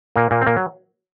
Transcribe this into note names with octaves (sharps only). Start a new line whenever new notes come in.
A#2 A#3
A#2 A#3
C4
A#2 A#3
F#3